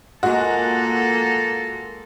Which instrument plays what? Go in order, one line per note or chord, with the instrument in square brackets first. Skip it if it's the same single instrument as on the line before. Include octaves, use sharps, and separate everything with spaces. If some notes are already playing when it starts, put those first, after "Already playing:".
[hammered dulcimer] A#2 G#3 [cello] A#3 A4 [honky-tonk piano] F#4